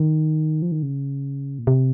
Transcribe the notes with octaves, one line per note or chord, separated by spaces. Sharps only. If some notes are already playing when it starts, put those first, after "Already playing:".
Already playing: D#3
F3
D#3
C#3
A#2
C3